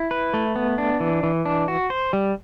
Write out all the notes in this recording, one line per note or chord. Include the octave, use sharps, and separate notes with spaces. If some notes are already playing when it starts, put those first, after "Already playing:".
Already playing: E4
B4
A3
B3
D4
E3
E3
D4
F#4
C5
G3